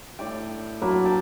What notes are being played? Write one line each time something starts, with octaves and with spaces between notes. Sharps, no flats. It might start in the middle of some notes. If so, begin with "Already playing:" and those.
A2 D5 G5
F#3 A#3 D4 B4
G5 A5